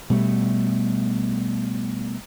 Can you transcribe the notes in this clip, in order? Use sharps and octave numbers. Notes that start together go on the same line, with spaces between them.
B2 G3 A3